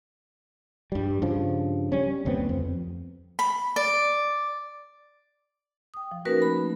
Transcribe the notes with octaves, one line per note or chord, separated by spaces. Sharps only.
G2 G3
G2 C#3 F3
G3 C#4
F#1 D2 B3 C4
F2
B5
D5
G5 D#6
F3
A#3 C#4 D#4 F#4 A#4 B4
A3 B5